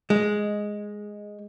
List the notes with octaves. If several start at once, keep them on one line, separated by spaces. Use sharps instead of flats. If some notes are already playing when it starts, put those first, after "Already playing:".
G#3